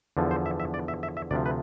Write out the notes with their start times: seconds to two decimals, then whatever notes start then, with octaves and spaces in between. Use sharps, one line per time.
0.17 E2 D3 F3
0.31 C5
0.46 E5
0.60 E5
0.74 D5
0.88 E5
1.03 E5
1.17 E5
1.31 D2 C3 F3 D5
1.46 B4